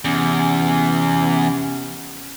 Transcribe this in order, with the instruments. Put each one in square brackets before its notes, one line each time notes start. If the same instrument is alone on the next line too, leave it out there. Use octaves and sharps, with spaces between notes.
[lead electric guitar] E2 [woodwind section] C3 B3 C#4